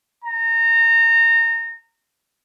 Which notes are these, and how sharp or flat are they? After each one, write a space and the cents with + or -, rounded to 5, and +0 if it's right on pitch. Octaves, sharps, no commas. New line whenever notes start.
A#5 -25